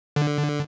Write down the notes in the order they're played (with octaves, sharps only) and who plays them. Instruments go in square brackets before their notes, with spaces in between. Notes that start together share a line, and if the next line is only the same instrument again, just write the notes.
[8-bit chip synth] D3